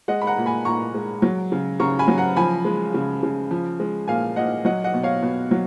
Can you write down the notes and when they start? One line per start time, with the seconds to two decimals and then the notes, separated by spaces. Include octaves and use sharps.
0.08 G#3 D#5 F#5
0.21 B5
0.27 F#5 A#5
0.38 A#2
0.46 G#5 B5
0.65 A#2 A#5 C#6
0.94 G#3
1.22 F#3
1.52 C#3
1.80 C#3 A#5 C#6
1.99 G#5 B5
2.08 F#3
2.18 F#5 A#5
2.36 F3 G#5 B5
2.65 G#3
2.94 C#3
3.23 C#3
3.51 F3
3.79 G#3
4.08 A#2 F5 G#5
4.36 A#2 D#5 F#5
4.65 F#3 D#5 F#5
4.84 D#5 F#5
4.94 B2
5.03 C#5 F5
5.22 B2
5.51 F#3